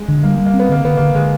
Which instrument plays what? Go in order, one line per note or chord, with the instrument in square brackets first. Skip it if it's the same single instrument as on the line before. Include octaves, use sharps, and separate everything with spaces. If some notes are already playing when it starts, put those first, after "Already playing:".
Already playing: [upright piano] G#3
[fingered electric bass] D3
[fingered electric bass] G3 [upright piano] A#3
[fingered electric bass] G3
[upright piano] A#3
[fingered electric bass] C4
[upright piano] B3
[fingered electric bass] D3 [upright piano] A#3
[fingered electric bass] D3 [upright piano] B3
[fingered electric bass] D3 [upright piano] A#3
[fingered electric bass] D3 [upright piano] G#3